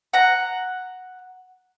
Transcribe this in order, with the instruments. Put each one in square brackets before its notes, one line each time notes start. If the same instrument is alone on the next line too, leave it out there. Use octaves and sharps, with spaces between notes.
[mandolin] F#5 A#5